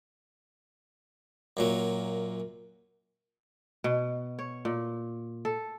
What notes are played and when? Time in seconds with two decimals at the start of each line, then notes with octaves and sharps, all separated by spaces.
1.57 F#2 A#2 F#3
3.84 B2
4.39 C#5
4.65 A#2
5.45 A4